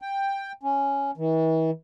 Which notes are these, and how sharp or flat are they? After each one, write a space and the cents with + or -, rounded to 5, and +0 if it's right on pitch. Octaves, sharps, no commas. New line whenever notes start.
G5 +10
C#4 +5
E3 -40